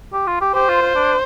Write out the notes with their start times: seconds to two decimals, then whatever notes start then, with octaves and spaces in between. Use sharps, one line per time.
0.13 G4
0.27 F4
0.41 G4
0.55 G4 C5
0.69 F4
0.82 F4
0.95 D4